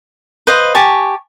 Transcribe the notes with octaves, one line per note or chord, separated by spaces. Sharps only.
B4 C5 D#5 F5
G4 G#5 A5 C#6